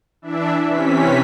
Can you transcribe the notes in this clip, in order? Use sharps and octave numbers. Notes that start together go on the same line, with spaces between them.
E3 D4 E5
C3 E3 C#4 B6